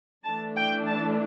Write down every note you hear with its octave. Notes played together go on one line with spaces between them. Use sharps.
E3 A3 D4 A5
G5
A5